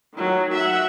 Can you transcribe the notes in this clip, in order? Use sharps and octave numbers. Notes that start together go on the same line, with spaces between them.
D#3 F#3
E5 F#5